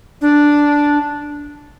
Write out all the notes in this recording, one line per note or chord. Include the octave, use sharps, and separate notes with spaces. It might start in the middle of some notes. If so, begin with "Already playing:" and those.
D4